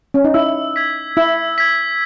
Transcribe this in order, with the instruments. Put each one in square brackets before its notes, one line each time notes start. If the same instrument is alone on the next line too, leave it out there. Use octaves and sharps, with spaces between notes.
[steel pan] C#4
D#4
[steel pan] E4 [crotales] E6
[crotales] G#6 B6
[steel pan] E4 [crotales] E6
[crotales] G#6 B6